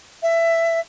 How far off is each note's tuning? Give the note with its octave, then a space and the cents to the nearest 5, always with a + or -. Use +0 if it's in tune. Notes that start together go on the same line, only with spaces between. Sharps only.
E5 +15